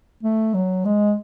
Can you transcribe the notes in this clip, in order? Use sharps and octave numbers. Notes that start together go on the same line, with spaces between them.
A3
F#3
G#3